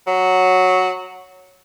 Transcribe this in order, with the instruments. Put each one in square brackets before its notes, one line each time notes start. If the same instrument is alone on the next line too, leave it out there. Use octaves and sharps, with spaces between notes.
[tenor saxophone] F#3